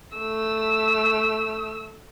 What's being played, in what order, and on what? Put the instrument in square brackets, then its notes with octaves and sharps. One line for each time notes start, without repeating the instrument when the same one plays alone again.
[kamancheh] A3 E6